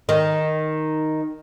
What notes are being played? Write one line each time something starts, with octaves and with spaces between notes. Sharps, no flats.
D#3